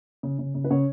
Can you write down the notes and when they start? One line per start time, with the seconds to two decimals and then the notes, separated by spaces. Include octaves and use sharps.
0.23 C#3
0.39 C#3
0.55 C#3
0.64 B4
0.70 C#3 C#4 C#5